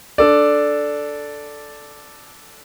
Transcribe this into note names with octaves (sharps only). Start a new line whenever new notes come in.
D4 A4 D5